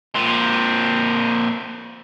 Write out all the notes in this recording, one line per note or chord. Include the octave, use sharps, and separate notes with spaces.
A#2 C4